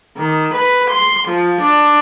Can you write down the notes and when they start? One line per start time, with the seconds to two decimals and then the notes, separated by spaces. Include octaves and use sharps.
0.18 D#3
0.54 B4
0.91 C6
1.28 F3
1.61 D4